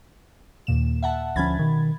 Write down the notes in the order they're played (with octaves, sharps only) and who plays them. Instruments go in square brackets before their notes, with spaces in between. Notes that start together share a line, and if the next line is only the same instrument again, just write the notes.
[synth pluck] D#2 A#2 E7
E5 F#5 A5
[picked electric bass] D2 F3 C#4 [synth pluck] B5 G#6 A6
[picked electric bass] B2 D#3